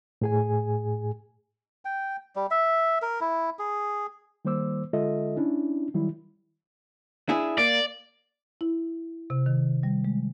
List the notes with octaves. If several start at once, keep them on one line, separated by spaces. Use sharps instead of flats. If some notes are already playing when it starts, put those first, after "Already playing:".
A2 G#4 G#5
G5
G3
E5
A#4
E4
G#4
D#3 G3 A#3 C5 D6 E6
D3 G#3 F4 A4 D#5 E5
C#4 D4 E4
D#3 F#3 G3 E4
D4 E4 G#4
A#3 D5
E4
C3
D#3
G3
G#3